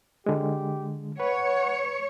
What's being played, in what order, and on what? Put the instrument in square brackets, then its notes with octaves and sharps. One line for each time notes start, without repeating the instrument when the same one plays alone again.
[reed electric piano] D3 G#3 [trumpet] G4
[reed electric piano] B4 [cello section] C#5 [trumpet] F#5